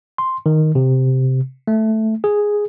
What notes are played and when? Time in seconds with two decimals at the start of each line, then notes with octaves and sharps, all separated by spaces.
0.18 C6
0.46 D#3
0.75 C3
1.68 A3
2.24 G#4